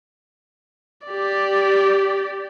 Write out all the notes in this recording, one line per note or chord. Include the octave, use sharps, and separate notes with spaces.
G4 D5